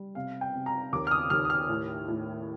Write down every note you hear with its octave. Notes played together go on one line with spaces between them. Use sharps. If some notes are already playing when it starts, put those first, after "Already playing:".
Already playing: G3
C3 F5
G5
C3
A#5
D#2 D6
F6
D#6
D#2 F6
D#6
F6
A2
A2